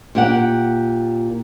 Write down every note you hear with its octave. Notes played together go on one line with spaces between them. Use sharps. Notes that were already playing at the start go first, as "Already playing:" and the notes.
A#2 G4 F#5